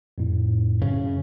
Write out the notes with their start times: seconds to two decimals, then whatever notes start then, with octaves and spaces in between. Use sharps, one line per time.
0.18 F2 A2
0.82 F#2 C#3